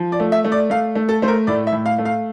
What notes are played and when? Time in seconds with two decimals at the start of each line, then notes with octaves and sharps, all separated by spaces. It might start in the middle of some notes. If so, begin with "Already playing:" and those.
Already playing: F3
0.12 D5
0.20 A3
0.32 E5
0.44 A3
0.52 D5
0.70 A3 F5
0.95 A3
1.09 A4
1.22 A3 C5
1.28 A#4
1.47 A2 D5
1.67 E5
1.72 A2
1.86 F5
1.98 A3
2.05 F5